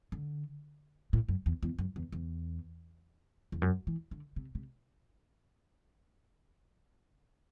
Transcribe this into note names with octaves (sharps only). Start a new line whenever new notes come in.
D3
A2
F#2
E2
E2
F#2
E2
E2
E2
F#2
E3
D3
C3
C3